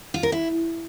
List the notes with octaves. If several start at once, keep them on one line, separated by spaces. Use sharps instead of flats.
F4
A#4
E4